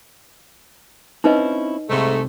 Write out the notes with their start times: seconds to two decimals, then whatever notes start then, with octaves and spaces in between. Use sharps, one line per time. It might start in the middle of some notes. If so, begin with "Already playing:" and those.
1.24 C4 C#4 D#4 E4 B4 D#5
1.89 C2 G#2 C3 A3